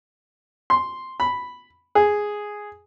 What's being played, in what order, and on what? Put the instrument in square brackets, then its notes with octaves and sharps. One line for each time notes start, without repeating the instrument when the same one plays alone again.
[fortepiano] C6
B5
G#4